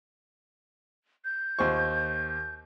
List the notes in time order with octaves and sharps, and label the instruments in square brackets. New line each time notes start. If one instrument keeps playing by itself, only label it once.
[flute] G6
[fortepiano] D#2 C5 C#6